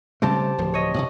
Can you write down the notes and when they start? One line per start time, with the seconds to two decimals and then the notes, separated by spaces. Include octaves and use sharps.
0.22 C#3 G3 A3 C4 G4 A5
0.58 D1 F3
0.74 C#5 D#5
0.94 A2 C3